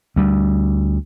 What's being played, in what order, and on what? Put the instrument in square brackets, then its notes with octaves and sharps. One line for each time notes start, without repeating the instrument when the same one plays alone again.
[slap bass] D2 G3